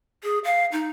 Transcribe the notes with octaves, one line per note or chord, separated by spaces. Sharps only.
G#4
F5
D#4